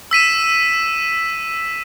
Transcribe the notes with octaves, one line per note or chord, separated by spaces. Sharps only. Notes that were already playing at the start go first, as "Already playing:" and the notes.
E6 B6 D#7 E7